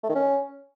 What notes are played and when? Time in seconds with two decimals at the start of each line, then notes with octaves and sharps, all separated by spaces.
0.03 A3
0.09 D#3
0.15 C#4